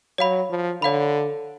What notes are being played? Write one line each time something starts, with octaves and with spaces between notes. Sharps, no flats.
F#3 C#5 F5 B5
F3
D3 C#5 F5 B5